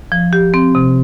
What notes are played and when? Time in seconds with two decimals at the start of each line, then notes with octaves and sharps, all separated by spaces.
0.12 F3
0.33 G4
0.54 C4
0.75 C3